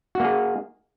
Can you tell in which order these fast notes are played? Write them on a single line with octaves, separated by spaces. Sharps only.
F#4 A#3 G#4